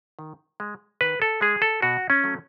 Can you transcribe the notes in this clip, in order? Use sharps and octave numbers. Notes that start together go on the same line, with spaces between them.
D#3
G#3
D#3 B4
A4
G#3 G#4
A4
B2 F#4
C#4
F#3 A3